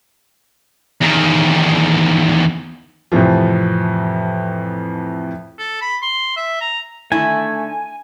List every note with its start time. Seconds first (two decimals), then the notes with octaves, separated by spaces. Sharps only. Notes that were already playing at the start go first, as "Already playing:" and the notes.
1.01 E2 D#3
3.12 F2 A2 C3 E3 F3
5.59 A4
5.81 B5
6.02 C6
6.37 E5
6.61 A#5
7.12 D3 D#3 A3 E4 G#5